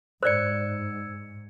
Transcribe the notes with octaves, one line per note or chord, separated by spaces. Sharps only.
G#2 C5 D5 E6 G#6 C#7